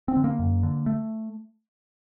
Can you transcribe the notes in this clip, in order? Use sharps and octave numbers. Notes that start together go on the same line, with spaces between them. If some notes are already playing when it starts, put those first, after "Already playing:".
C4
D3
A#3
F#2
D3
A3